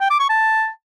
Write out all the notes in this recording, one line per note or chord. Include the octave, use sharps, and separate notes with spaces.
G5
D6
C#6
A5